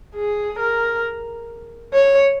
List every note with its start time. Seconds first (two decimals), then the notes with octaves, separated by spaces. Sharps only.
0.15 G#4
0.59 A#4
1.93 C#5